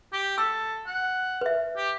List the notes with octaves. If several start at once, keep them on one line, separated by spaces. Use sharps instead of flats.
G4
A4 E6
F#5
B4 E5
G4